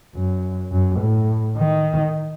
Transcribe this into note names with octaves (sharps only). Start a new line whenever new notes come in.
F#2
F#2
A2
D#3